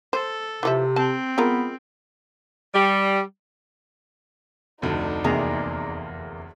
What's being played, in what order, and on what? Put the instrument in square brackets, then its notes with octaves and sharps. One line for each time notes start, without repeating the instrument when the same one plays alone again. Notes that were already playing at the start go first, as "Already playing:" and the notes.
[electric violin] A4 [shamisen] C5
[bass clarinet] C3 [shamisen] E3 F3 E5
[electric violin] C4 [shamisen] A5
[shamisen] G#3 F4 A#4 [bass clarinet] B3
[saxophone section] G3
[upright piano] F1 D2 D3 [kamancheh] D#4 D5
[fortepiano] E2 A#3 [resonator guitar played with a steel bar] C3 G#4 A#5